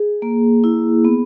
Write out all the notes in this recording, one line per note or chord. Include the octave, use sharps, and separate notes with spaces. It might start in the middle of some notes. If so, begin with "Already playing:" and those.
Already playing: G#4
A#3
E4
B3